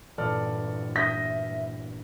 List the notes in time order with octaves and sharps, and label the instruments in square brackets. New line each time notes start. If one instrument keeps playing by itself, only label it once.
[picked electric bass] G2 A#2 E3 [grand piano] A4 D5 F6
[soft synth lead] E5 [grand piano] D#6 G6 B6 [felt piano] A#6